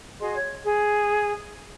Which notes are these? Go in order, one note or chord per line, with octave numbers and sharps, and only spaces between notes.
F#4 G#4 D#5 C6
C#5
G#4